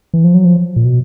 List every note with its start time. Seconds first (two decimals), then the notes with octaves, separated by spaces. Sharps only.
0.14 E3
0.24 F3
0.34 F#3
0.45 F3
0.76 A#2
0.85 B2